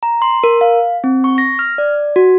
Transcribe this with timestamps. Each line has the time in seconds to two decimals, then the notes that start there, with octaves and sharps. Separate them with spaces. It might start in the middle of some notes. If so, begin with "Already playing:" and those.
0.03 A#5
0.22 C6
0.44 A#4
0.61 F5
1.04 C4
1.24 C#6
1.38 A#6
1.59 F6
1.78 D5
2.16 F#4